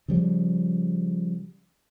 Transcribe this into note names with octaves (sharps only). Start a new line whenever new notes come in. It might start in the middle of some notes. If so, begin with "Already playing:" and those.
C#3 F3 G3